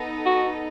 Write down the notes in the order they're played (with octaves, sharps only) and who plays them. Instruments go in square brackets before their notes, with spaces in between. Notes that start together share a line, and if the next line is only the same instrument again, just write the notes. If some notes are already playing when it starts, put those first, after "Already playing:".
Already playing: [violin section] B3 D#4 A4 D#5
[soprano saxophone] F#4